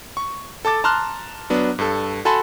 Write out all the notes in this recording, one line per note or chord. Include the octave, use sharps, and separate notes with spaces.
C#6
A4 A5 D6 A6
A5 A#5 C6 F6 F#6
F#3 B3 D4
G2 A4
F#4 A4 G#5 A5 B5 C6